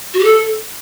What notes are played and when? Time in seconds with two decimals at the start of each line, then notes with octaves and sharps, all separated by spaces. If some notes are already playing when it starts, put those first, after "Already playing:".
0.14 F#4
0.19 G4
0.24 A4